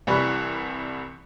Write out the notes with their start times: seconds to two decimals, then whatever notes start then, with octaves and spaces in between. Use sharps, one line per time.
0.07 C2 E3 G3 B4 C#6 F#6